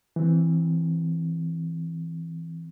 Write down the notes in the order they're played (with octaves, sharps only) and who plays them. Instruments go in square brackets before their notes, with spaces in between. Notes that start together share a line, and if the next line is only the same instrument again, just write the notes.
[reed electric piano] E3 C4